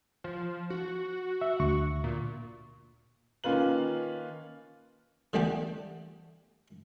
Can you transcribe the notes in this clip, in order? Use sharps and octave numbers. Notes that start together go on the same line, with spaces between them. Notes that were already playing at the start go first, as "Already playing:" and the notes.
F3
F#4
E5
D2 C#6
A#2
D#3 A#3 C#4 F4 B4 F#7
D3 E3 G3 B3 D4 G4